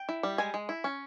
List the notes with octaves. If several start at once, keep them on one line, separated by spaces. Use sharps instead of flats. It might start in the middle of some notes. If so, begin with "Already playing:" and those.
Already playing: G5
E4
G3
G#3 G#5
G#3
E4
C#4